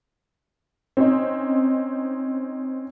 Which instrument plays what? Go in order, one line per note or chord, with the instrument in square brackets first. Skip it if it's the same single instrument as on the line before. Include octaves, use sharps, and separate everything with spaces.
[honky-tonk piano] C4 C#4 D#4